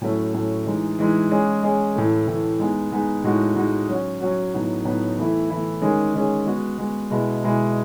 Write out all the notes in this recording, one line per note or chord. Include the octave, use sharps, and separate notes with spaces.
A2 F#3 A3 C#4
A2 F#3 A3 C#4
E3 G#3 D#4
E3 G#3 D#4
G#3 C#4 G#4
G#3 C#4 G#4
A2 E3 A3
A2 E3 A3
G#3 B3 D#4 G#4
G#3 B3 D#4 G#4
A2 G#3 D#4 F#4
A2 G#3 D#4 F#4
F#3 C#4 F#4
F#3 C#4 F#4
A2 F#3 B3 D#4
A2 F#3 B3 D#4
E3 A3 E4
E3 A3 E4
D#3 G#3 C#4 G#4
D#3 G#3 C#4 G#4
G#3 B3 F#4
G#3 B3 F#4
B2 G#3 B3 E4 G#4
B2 G#3 B3 E4 G#4